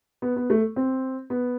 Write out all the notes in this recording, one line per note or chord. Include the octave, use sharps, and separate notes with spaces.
B3
B3
A3
C4
B3